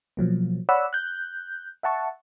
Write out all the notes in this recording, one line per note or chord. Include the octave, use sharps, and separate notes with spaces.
B2 F3 F#3 A#3
C#5 D5 F#5 B5 E6
F#6 G6
E5 F#5 A5 C#6